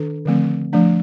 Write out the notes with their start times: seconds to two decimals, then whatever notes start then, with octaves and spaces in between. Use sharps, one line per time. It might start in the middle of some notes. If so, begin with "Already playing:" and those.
Already playing: D#3 D4 A4
0.25 D3 F3 A3 C4
0.73 F3 A3 D4